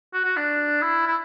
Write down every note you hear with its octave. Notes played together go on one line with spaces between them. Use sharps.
F#4
F#4
D4
E4
E4